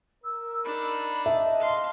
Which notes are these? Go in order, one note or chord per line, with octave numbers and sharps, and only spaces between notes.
A#4 E6
D4 D#4 B5
D#5 E5 A5
F5 C6